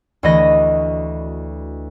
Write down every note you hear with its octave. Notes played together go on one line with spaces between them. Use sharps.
D2 E3 F#4 D#5 B5 A#6